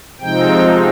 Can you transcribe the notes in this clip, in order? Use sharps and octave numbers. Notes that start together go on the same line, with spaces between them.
C3 F3 G#3 C4 D#4 G5